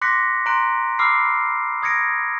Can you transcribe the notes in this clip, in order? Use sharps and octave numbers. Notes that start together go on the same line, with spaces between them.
C6 D6 F#6 A#6 B6 C#7
A#5 C6 F#6 D7
B5 D6 E6 F6 C7
D#6 G#6 A#6 C#7 D7